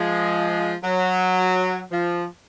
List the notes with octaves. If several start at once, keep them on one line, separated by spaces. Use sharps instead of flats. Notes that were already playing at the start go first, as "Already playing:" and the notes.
Already playing: F3 G#3
F#3
F3